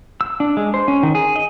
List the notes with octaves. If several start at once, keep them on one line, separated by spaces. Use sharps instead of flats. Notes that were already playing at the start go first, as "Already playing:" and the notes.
E6
D4
G#3
C5
C#4
D#3
G#4
D#5